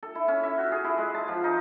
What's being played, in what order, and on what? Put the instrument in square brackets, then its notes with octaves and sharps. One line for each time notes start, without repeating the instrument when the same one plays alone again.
[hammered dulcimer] A4
E4
C#4
E5
F#4
G#4
E4
G#3
A5
F3
D#4